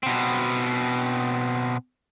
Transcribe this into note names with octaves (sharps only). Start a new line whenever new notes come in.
B2 C4